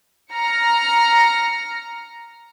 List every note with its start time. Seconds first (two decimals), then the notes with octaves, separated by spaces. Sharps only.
0.32 A#5 F6 A#6 C#7